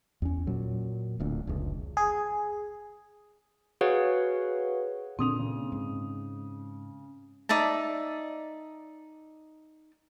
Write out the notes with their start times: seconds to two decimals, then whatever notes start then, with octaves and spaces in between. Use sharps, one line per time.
0.22 E2 C#4
0.47 A#2 F#3
1.20 D1 D2 A#2
1.47 F1 C#2
1.97 G#4
3.81 F#4 G#4 B4 C#5 F5 F#5
5.19 A#2 D3 C4 D#6 F7
5.39 C#3
5.72 G#2
7.49 D#4 D5 E5 A5